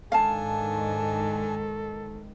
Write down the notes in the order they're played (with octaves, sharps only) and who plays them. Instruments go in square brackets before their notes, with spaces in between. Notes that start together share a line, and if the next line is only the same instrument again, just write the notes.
[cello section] G#2 D#3 [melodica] D4 G#5 [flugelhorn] A4 [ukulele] F5 A5